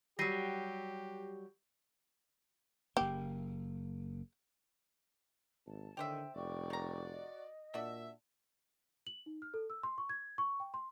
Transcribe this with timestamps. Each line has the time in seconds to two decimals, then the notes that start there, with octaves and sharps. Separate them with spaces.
0.19 F#3 G3 G4 A#6 C7 D#7
2.97 F#1 A#3 G4
5.66 G#1 A5
5.97 A2 D3 D#3 G4 C5 E5 G5
6.35 F1 F#4 D5 G5 C#6 D6
6.70 D#3 A#5
7.10 D#5
7.74 A#2 D4 F#4 E5
9.07 F#7
9.26 D#4
9.42 F6
9.54 A4
9.70 E6
9.83 C6
9.98 C#6
10.09 G#6
10.38 C#6
10.60 G5
10.74 C6